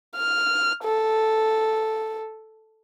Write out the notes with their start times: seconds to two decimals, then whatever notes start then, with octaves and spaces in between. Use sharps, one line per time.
0.16 F6
0.84 A4